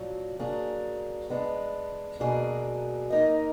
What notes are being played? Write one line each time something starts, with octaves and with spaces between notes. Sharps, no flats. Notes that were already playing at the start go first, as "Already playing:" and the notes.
Already playing: A#2 F#3 D4
F#3 A#3 D4 G#4
G#3 B3 D4
B2 F#3 A#3 D4 G#4
A#3 D#4 A#4 D#5